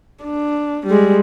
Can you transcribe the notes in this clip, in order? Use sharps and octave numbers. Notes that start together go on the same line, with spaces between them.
D4
G3 G#3